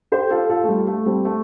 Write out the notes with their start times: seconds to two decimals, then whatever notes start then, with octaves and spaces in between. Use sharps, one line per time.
0.12 G4 C5
0.31 F4 A4
0.50 F4 A4
0.64 A3
0.69 G3
0.87 A3
1.06 G3 C4
1.25 A3